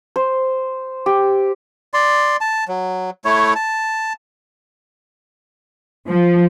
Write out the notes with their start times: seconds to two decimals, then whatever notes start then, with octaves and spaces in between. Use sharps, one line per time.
0.16 C5
1.06 G4
1.94 D5 C6
2.41 A5
2.68 F#3
3.25 A3 E4 C#5
3.56 A5
6.08 F3